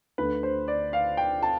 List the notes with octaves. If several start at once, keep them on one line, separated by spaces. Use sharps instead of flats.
D2 D3 A3 B4
C5
D5
F5
G5
A5